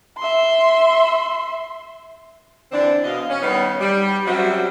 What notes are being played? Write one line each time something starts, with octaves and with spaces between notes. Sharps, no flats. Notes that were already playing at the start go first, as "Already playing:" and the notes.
E5 C6
D3 E3 C4 D4
B2 D#5 F5
C#4
D#3 G3 B3 C#4 D#4
G3
F#2 F#3 G3 C4 F#4 E5